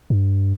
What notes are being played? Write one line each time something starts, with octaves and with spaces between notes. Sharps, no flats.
G2